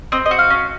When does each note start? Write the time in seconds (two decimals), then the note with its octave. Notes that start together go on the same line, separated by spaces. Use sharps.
0.12 C4 D#5
0.26 D#5
0.31 F#4
0.39 F5
0.50 C#4